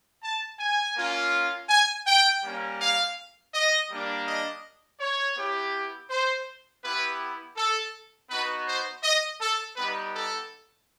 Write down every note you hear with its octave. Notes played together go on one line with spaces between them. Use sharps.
A5
G#5
A#3 C#4 F4
G#5
G5
G3 A#3 C#4
F5
D#5
G3 A#3 D4
D#5
C#5
B3 E4 G4
C5
B3 E4 G4 B4
A4
B3 D#4 F#4 B4
C5
D#5
A4
G3 B3 D#4 G4 B4
A4